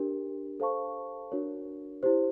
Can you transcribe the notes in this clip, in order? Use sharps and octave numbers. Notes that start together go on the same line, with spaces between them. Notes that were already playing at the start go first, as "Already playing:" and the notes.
Already playing: D4 G4 A#4
A4 C5 F5 A5 C#6
D4 F#4 A#4 C#5
E4 G4 C5